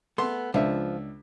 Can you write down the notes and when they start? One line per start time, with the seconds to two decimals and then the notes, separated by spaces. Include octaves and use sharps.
0.18 A3 B3 C6
0.54 C#2 F3 D4 E5